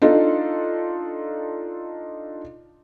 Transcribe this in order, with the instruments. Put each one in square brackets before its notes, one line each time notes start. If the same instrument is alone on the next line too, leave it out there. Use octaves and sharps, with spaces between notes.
[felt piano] D4 D#4 F4 A4